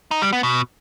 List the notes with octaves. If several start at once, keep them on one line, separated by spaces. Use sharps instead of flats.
D#4
G3
B3
B2